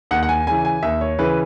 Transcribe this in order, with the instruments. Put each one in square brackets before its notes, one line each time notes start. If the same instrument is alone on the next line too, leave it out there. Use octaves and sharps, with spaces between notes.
[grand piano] D#2 F#5
F#5
G#5
C#3 E3 G#5
G#5
D#2 E5
C#5
C#3 E3 B4